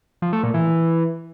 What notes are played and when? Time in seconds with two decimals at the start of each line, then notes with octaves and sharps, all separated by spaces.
0.22 F3
0.33 A3
0.43 A#2
0.54 E3